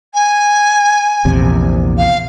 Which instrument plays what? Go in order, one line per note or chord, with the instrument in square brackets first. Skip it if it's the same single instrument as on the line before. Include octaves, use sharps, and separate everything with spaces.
[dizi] G#5
[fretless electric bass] A#1 E2 C3
[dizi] F5